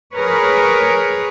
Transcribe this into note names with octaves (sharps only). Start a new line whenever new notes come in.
G#4 A#4 B4 C#5